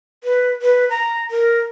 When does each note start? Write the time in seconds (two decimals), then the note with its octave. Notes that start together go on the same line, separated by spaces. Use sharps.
0.24 B4
0.62 B4
0.90 A#5
1.31 A#4